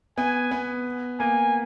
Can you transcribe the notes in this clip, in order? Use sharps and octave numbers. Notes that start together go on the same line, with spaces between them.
B3 G#5
B3
A#3 G#5